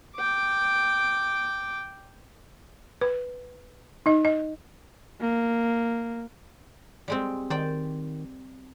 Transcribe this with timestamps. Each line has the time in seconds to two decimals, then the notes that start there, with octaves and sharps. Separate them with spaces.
0.16 G5 D6
3.01 B4
4.06 D#4 D#5
4.25 D#5
5.21 A#3
7.08 G3 G#3 C4
7.50 D#3 C5 D5 G5